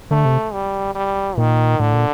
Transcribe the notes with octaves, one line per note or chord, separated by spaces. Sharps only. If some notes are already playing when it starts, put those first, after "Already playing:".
D3 A3
C3
G3
G3
A#2 D#3
A2 D3
A#2